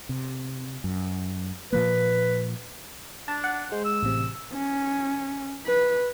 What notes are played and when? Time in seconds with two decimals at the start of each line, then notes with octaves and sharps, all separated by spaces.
0.09 C3
0.84 F#2
1.72 A#2 F3 A#3 B4
3.28 D4 A5
3.44 F#5
3.72 G#3 C5
3.85 E6
4.03 A1 C3
4.53 C#4
5.66 B4